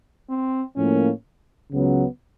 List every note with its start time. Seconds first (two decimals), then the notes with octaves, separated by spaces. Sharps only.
0.29 C4
0.76 A2 F3 A#3 C#4
1.72 C#2 C#3 F#3 B3